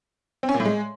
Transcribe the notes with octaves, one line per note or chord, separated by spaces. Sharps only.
C4
C#4
A#2
A2
G#3